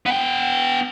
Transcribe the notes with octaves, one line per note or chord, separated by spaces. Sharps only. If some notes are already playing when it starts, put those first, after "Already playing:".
B3 G5